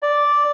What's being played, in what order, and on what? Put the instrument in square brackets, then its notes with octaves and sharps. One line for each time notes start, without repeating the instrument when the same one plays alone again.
[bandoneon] D5